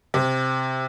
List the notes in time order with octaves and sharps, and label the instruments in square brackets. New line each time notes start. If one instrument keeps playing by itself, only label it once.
[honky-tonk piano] C3